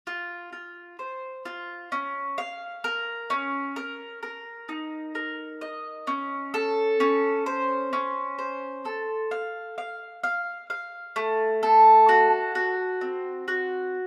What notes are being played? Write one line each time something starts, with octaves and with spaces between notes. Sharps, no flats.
F4
F4
C5
F4
C#4
F5
A#4
C#4
A#4
A#4
D#4
A#4
D#5
C#4
A4
C#4
C5
C#4
C5
A4
F5
F5
F5
F5
A3
A4
F#4
F#4
C4
F#4